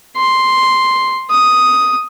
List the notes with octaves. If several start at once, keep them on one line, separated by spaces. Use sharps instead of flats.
C6
D#6